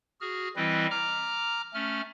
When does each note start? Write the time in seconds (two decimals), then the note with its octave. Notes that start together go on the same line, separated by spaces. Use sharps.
0.21 F#4 G#4 F6
0.56 E3 G3 C4 E4 B4 D#5
0.91 A#5 D6 F6
1.74 A3 C#4 F6